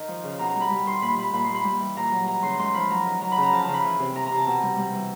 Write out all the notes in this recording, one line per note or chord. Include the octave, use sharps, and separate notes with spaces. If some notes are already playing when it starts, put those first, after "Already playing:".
Already playing: D#3 D#5
F3
C#3
B2 A#5
A#5
G3
B5
G3
D#3 C6
A#2 B5
G3 B5
A#2 B5
G3 C6
B5
G3
E3
A#2 A#5
F#3
E3 A#5
C#3 C6
G#2 C6
F3 B5
F#3 A#5
D#3
F#3 A#5
B5
C#3
A#5
F3 A5
A#5
C#3
B5
E3
C3
E3 A#5
C3 A#5
A5
B2 A#5
G3
G3
E3